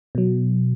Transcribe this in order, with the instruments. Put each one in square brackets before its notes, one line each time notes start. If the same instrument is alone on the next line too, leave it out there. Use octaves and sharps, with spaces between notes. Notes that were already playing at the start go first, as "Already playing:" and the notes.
[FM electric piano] B2 F#3